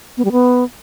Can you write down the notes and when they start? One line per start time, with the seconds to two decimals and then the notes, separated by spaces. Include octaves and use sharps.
0.17 B3
0.25 G3
0.32 B3